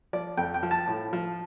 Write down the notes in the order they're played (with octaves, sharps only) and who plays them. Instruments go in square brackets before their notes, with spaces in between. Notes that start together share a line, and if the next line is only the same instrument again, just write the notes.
[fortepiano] F3 D5
F2 G5
G5
F3
A5
A2
F3